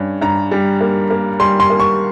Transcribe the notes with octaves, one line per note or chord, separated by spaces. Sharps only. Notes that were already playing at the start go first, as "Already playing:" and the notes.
Already playing: G2 C#4
G2 A#5
G3
A#3
A#3
G3 C6
C6
A#3
C#6